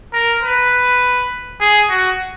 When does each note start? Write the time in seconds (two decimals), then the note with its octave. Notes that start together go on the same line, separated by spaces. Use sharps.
0.13 A#4
0.43 B4
1.61 G#4
1.90 F#4